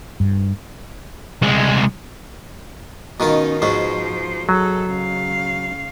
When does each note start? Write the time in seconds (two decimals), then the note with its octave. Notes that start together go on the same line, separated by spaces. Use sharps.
0.20 G2
1.42 C2 G#3
3.20 B2 D#3 C#4 D#4 F4
3.62 G#2 B2 F3 C#4 C5
4.49 F#3 G#4 A4
4.89 C#3 F5